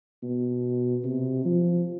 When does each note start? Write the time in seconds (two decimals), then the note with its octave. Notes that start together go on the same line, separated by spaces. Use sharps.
0.23 B2
1.04 C3
1.45 F3